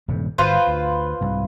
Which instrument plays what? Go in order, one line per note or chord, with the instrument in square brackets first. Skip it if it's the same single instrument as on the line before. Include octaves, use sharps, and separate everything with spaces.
[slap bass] D#1 G2 C3
[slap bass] G1 [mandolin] F4 B4 C5
[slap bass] D2
C2 G#2